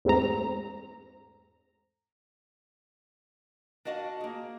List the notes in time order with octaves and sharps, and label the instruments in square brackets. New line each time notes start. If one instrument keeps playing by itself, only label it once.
[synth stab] E2 G#2 A3 C4 A#5
[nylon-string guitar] D4 F#4 D#5 F5 A5
A#3 G#4